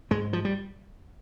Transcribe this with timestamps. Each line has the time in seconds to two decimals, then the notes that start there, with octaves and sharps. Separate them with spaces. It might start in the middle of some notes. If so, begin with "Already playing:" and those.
0.11 G#2 G#3
0.33 F3
0.45 G3